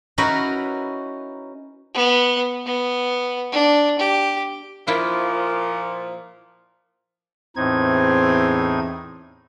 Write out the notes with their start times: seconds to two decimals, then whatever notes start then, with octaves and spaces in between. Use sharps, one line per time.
0.18 C#4 D#4 E4 F#4 A#4 B4
1.95 B3
2.66 B3
3.52 D4
3.99 G4
4.87 A#2 F3 E4 F4 A#4
7.56 E2 A2 C4 D#4 G#6